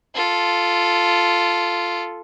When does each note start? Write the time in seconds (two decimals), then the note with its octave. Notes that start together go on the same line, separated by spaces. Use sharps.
0.15 F4 A4